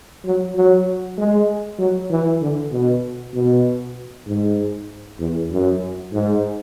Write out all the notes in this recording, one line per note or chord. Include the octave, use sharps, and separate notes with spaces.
F#3
F#3
G#3
F#3
E3
D3
B2
B2
G#2
E2
F#2
G#2